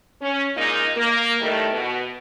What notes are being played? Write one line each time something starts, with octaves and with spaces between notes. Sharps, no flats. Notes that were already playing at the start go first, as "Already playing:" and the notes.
C#4
A#2 G#3 A#3 D#4
A#3
A2 D#3 G3 A3
B2